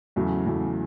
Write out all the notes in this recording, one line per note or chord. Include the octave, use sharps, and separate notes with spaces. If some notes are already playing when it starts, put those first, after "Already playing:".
E2 C#3 F#3 A3
E2 C#3 F#3 A3